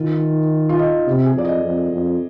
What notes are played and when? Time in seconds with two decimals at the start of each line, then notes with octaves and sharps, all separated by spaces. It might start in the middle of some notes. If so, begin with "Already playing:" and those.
Already playing: D#3 F4
0.69 F4
0.79 D#4
1.07 C3
1.25 G#4
1.35 F2 D5
1.45 D#5
1.63 F2
1.91 F2